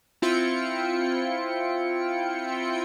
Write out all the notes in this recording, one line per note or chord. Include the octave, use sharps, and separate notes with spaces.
C4 E4 F4 G5 C#7